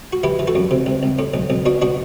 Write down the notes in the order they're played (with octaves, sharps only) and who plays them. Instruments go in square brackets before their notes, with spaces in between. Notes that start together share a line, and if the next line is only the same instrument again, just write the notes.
[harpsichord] F#4
E3 E4 G4
E3
F#4 A4
F#2
C3
C2
C2
A2
B1
B1
B2 D4 F#4
B2 D4 F#4